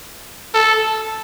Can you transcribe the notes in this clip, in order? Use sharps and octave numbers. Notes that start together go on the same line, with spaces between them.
A4